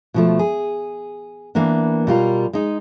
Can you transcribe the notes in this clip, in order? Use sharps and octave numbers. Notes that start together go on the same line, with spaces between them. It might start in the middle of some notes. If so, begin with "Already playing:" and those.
B2 F3 A3
G#4
E3 A#3 B3 D4
B2 G3 F4 A#4
G#3 D#4